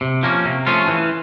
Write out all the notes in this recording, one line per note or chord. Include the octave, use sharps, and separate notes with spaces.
C3
F3 A#3 C#4
C3
F3 A3 C#4 F4
E3